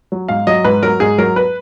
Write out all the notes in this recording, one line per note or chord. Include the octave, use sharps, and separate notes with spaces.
F#3
G#2 F5
F#3 D#5
G#2 B4
F#3 A#4
G#2 G#4
F#3 A#4
B4